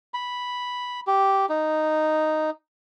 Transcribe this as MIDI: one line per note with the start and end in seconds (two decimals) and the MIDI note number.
0.14 1.00 83
1.07 1.46 67
1.49 2.50 63